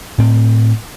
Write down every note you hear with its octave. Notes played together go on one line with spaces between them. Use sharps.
A2 C4